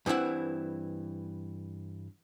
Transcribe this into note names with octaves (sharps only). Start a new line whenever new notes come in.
G2 E3 C4 E4 F#5